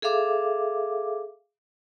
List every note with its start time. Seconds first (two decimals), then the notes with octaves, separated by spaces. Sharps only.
0.02 G#4 A4 E5 F5 D6